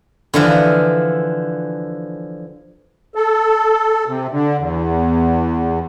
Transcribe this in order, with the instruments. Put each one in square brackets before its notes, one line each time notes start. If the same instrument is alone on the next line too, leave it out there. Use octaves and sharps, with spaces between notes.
[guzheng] D3 E3 F3
[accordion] A4
C3
D3
E2